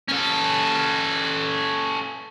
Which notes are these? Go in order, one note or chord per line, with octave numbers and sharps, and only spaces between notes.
C#4 A4